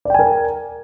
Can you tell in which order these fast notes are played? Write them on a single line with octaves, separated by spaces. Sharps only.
D5 G5 G#5 A#4